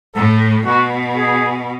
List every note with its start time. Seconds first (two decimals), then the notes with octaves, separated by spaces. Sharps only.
0.15 A2 A4
0.65 B2 F#4
1.16 G#4